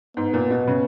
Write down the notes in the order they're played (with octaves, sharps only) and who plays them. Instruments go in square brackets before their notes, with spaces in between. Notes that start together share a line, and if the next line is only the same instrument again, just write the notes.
[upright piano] G#2 [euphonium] B3
[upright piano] A#2
B2
C#3